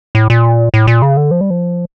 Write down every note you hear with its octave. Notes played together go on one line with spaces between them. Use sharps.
A2
A#2
A2
A#2
C#3
D3
F3
G3
F3